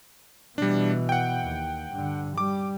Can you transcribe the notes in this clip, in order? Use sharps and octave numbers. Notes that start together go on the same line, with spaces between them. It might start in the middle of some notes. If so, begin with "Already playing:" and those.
B2 E3 G3 D4
F#5 G5
D#2
G2 D3
G3 D6